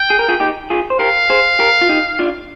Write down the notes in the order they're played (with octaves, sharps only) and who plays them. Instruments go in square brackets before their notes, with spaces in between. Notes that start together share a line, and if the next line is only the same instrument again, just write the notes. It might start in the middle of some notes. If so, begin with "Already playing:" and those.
Already playing: [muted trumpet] G5
[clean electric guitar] G#4
A#4
F4 G#4
D#4 G4
F4 G#4
C5
[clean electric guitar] G4 A#4 [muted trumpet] F5
[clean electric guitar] G#4 C5
G4 A#4
F4
D#4 G4
D4 F4